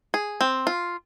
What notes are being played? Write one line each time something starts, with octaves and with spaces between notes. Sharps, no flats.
G#4
C4
F4